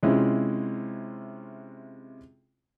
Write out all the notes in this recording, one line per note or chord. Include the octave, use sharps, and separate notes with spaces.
C3 G#3 C#4 E4 F4